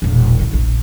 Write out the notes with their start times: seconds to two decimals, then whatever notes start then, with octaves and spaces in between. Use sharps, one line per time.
0.02 E1 A#1
0.39 A1 C#3
0.53 A#1